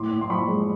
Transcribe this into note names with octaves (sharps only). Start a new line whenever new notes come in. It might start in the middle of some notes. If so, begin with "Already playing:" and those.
Already playing: A2 C6 D6
A2
C6
F3 B5 C#6
G#3